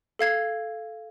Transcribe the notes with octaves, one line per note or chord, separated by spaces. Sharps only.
A4 F5 G#6 C7